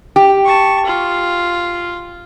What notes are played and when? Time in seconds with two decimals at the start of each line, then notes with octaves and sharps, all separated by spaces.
0.16 G4
0.45 A5 C#6
0.85 F4